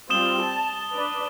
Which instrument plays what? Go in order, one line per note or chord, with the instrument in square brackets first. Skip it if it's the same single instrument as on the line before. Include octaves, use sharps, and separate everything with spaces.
[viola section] G3 C4 F4 [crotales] D#6 E7 G7
[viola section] A5
D4 B4 D5